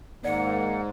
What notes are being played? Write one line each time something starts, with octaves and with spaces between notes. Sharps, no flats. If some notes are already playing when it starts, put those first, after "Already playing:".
G#2 D#3 A#3 D5 F#5